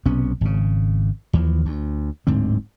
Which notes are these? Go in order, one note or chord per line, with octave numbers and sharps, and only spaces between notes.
B1 C3 B3 C#4
G#1 C#3
D#2 E3 F3
D2
D1 G#2 D3 C4